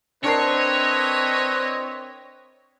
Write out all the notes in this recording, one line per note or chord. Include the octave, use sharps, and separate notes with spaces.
C4 D4 E4 A#4 B4 C#5 D#5 C7